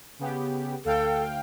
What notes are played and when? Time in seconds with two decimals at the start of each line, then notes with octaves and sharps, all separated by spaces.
0.19 C#3 B3 G4
0.85 D2 A4 F5 G5